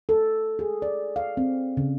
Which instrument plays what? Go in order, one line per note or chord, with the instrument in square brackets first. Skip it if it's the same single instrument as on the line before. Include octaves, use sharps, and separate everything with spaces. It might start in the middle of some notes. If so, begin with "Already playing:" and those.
[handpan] A4
G#4
D5
F5
C4
C#3